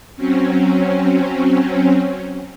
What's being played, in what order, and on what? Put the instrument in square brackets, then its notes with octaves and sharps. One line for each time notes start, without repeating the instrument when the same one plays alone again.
[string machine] F#3 C4 C#4